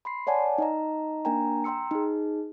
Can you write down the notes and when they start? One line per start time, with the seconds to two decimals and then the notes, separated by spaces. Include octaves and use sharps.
0.05 B5 C6 C7
0.27 C#5 D5 F#5 G#5 A5
0.58 D#4 D#5 A#5
1.25 A#3 D4 A#4 G5 G#5 A#5
1.64 G5 A#5 C6 E6 C#7
1.91 D#4 G#4